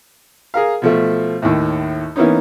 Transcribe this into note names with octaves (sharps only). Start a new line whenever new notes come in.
G#4 A#4 F5
B2 F3 A3
D#2 A2
E3 A#3 B3 C#4 D#4